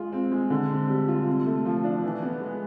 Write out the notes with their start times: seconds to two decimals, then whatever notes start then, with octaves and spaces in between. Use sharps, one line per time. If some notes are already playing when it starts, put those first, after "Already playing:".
Already playing: G#3 F4
0.12 C4
0.31 G#3
0.50 D3
0.70 C4
0.89 G3
1.08 F4
1.27 C3
1.46 A3
1.65 F3
1.84 D4
2.04 E3
2.22 B3
2.41 G#3